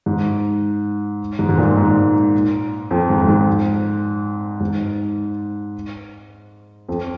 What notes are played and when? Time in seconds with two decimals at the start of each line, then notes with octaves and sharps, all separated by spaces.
0.06 G#2
1.39 G#2
1.49 G#2
1.58 A#2
1.77 G#2
2.91 F2
3.10 G#2
3.21 F2
3.28 G#2
4.60 G#2
6.89 F2